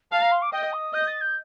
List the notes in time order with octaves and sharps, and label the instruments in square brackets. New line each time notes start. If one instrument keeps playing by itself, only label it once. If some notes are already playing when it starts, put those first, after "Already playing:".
[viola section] F5 [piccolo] A5
[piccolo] A#5
C6
D6
[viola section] D#5 [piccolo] G5
[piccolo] D#6
[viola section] D#5 [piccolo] G6
[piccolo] A6
G6